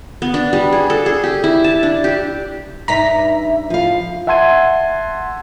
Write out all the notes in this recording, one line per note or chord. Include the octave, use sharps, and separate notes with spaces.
B3
D4
G3
G#4
A4
G#4
G4
E4
A5
D4
G4
G2 D#4 E5 A#5 B6
F3 E4 F5
E5 F#5 A5 C6 G#6 D#7